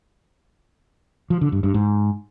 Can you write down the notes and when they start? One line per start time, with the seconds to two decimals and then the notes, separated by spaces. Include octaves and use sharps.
1.30 F3
1.41 D3
1.52 G2
1.63 G2
1.74 G#2